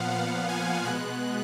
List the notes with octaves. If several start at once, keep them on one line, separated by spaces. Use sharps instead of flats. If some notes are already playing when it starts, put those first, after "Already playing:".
Already playing: A#2 F3 B3 F5 F#5
F#5
G#5
B2 G#3 B3 F#6